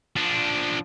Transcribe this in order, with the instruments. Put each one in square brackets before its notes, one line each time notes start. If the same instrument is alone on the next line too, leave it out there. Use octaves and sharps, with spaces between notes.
[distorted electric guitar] F3 D4